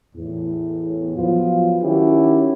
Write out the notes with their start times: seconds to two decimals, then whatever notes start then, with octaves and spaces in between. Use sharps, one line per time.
0.15 E2 A2
1.17 F3 F#3 B3 F4
1.83 D#3 C#4 E4 F#4 G4